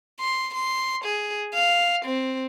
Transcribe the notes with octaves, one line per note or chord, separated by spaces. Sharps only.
C6
C6
G#4
F5
C4